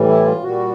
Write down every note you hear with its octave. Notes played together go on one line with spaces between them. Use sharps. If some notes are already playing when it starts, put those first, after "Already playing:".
Already playing: A2 E3 G3
E4
F4
A#2 G3 F#4